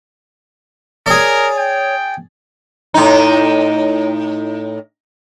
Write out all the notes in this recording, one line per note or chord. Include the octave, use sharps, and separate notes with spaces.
G#4 A#4 C#5 D5
G5
A2 D#4